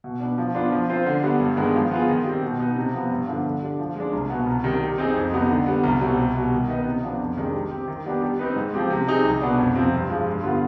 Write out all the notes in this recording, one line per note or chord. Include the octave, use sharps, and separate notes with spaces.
B2
B3 D4
F3
B3 D4 F4
F3
C4 F4 C5
D3
G3 B3 D4
G2
D#3 G#3 B3 D4
F3
B3 F4 G#4
D#3
G3 C4
B2
B3 D#4 B4 D#5
C3
F3 B3
G2
D3 F3 B3 D4
D3
G3 D4
F3
G#3 D4
C2
B2 B3
C2
C3 D#3 G3
G3
C4 D#4 G#4
F2
C3 G3 B3 D#4
D3
G3 B3
C2
B2 G3 C4
C2
B2 G3
D#3
B3 D#4 B4 D#5
C3
F3 B3 D4
F2
C3 D#3 G#3 D4
G3
C4 G4
D#3
G3 B3 D4 G4
G3
C4 D#4 B4
G#2
F3 C4 G4
C3
G3 C4 D#4 G#4
C2
B2 B3 D4
F2
C3 F3 C4
G2
F3 G#3
G2
D3 G3 B3 F4